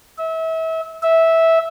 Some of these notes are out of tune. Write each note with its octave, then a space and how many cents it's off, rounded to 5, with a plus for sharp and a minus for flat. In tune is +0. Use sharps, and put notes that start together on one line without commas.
E5 -30
E5 -10